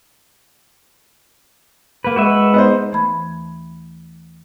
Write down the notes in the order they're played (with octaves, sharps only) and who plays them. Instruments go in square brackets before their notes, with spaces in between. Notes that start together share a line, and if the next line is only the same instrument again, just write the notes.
[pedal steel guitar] A#3 B4
[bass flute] G#3 [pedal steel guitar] F#4 B4 E5
[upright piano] B3 D#4 C5
[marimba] D#2 E3 A3 A5 B5 G#6